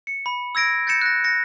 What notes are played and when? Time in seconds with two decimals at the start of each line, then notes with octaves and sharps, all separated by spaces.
0.07 C#7
0.26 B5
0.55 E6 G#6 A#6 D7
0.87 G6 A6 A#6 C#7 E7
1.01 F#6 A#6
1.24 A#6 C#7